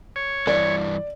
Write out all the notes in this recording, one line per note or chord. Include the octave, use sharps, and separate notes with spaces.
C#5
G2 E3 D5